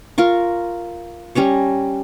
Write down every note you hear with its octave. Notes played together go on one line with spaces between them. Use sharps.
F4 A#4 C#6
G3 C#4 A#5 C#6